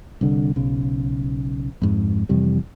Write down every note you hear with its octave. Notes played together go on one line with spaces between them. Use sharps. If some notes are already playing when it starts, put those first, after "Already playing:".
C2 D3
B1 C#3
F2 G#2
F2 C3 E3 G3